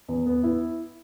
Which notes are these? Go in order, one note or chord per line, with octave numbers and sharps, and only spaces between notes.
E2
B3
E4